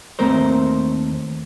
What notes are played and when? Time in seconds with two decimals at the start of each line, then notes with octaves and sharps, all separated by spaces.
0.19 D#2 A3 C4 A#4 C5